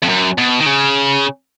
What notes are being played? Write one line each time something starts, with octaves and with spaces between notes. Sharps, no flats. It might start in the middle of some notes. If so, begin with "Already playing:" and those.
F2
F#2
B2
D#3
C#3